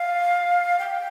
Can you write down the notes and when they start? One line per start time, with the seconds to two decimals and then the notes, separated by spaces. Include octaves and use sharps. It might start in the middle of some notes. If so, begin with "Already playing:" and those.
Already playing: F5
0.79 G5